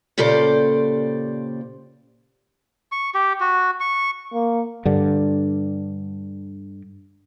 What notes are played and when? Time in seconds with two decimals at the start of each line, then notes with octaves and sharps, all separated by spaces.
0.18 A#2 C#3 G4 A4 C5 D5
2.92 C#6
3.14 G4
3.40 F#4
3.80 C#6
4.33 A#3
4.86 G2 D3